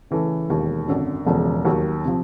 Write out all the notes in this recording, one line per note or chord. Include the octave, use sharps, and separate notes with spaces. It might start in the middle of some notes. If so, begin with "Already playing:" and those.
C#3 E3 A3 C#4
E1 D#2 D#3
G#1 F#2 D3
E1 E2 C#3 F3 A3
D#2 D#3 F#3
C3 F3